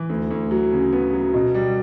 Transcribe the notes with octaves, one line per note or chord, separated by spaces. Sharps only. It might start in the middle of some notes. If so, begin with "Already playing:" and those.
Already playing: E3
D2
D2
F#3
C#3
B3
F#3
B2
G3